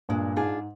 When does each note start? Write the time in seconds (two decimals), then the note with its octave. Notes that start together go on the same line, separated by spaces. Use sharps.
0.09 G2 A#2 G#3
0.36 G#2 D4 F4 G#4